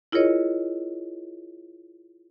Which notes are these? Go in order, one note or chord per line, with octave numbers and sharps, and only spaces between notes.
E4 F4 G#4 A#4 C#5 D#5